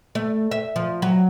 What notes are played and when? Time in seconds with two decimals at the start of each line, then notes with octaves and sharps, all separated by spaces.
0.15 A3
0.51 E5
0.76 F3
1.02 F#3